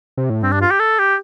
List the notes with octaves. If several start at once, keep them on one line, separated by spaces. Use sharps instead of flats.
C3
A2
G2 C4
D4
F4
G4
A4
G4